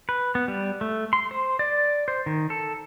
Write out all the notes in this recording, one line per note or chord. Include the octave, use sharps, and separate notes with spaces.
B4
B3
G3
A3
C6
C5
D5
C5
D#3
A4